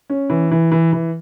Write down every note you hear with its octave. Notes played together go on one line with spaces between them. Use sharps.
C#4
E3
E3
E3
E3